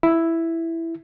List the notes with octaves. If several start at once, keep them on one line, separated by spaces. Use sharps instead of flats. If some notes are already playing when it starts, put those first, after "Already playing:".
E4